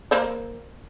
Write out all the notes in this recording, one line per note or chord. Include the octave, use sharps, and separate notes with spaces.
A#3 C5 D5